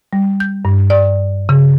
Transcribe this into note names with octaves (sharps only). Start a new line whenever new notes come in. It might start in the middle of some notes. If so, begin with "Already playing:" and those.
G3
G6
G2
D5
C#3